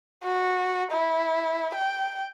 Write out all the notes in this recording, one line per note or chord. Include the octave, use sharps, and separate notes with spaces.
F#4
E4
G5